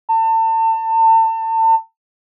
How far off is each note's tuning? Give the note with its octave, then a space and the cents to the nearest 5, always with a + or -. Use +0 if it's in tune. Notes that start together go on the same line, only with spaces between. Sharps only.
A5 +35